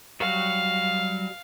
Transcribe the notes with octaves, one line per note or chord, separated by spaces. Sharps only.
F#3 G3 F#4 F5